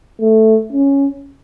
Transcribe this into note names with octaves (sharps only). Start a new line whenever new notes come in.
A3
C#4